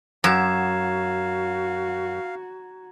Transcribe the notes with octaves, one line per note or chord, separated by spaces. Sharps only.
F#2 F#4 F5 A#5 G#6 E7